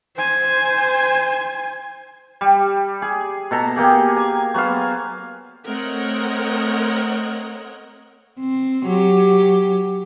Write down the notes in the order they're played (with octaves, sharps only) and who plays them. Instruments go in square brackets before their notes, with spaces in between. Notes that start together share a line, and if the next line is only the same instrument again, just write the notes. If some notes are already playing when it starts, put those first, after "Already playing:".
[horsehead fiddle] C5 G#5
[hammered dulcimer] G3
G#4
B2 A4 A#5
A#3 G4 G#4
G#5
F#3 B3 C5 F5
[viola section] A3 C4 A#4 C#5 D#5 F#5
[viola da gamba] C4
F#3 G4